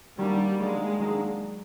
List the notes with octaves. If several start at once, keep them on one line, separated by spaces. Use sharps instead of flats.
D#3 F#3 G3 A#3 D4
D#3 F#3 G#3 A#3 D4
D#3 F#3 A#3 D4